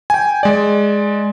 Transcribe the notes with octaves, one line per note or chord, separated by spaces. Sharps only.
G5 G#5
G#3 D5